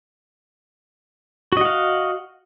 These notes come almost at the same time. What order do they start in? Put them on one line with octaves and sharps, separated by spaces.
F#4 D#5 F#5 F5